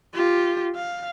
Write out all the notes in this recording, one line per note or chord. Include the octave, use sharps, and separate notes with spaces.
F4 G4
F5